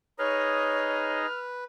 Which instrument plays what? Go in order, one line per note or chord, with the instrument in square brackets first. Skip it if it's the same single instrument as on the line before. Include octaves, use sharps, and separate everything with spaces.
[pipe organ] D#4 G#4 D#5 [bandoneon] B4 [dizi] C#5 [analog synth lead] F6